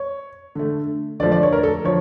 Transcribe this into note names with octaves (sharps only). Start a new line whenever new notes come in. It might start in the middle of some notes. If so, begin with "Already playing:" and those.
Already playing: C#5
D3 A3
D3 F3 A3 D5
D5
C#5
A#4
A4
D3 F3 C#5